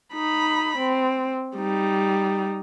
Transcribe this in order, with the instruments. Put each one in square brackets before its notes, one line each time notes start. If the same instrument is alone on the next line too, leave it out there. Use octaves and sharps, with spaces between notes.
[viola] D#4 B5
C4
G3 D#4